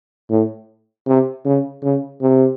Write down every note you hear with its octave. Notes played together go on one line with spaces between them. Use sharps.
A2
C3
C#3
C#3
C3